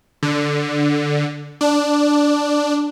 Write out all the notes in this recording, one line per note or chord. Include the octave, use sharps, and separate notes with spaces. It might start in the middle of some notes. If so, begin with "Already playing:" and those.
D3
D4